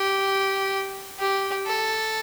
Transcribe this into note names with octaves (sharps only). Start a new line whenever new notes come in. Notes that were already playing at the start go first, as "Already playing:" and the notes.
Already playing: G4
G4
A4